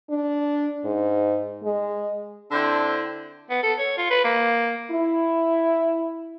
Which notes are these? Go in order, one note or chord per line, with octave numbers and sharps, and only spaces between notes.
D4
G#2
G#3
D3 C4 D4 E4 C5 G5
B3
A4
C#5
F4
B4
A#3
E4